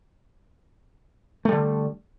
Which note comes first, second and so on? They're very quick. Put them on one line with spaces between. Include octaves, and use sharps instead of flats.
A3 G3 D3